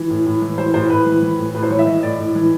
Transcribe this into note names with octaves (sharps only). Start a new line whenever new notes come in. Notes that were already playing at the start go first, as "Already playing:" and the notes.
Already playing: E3
A2
A2
E3
E3 C5
A2 C5
A2 B4
E3
E3
A2
A2 B4
C5
E3 C#5
E5
E3 D#5
A2 D5
A2
E3